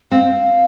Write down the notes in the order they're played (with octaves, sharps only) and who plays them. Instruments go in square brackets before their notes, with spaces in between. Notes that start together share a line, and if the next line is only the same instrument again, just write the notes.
[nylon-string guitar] C4 [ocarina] F5